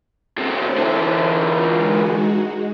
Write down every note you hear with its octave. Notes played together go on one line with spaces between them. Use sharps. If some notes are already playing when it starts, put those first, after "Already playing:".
A2 C4 C#4 C5
D3 E3
F4
G#3 D#4 F#4